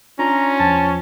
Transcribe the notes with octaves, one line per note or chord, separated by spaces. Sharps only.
C#4 D4 F4 A#5
E2 F3 A5